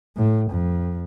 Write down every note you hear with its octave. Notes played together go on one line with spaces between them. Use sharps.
A2
F2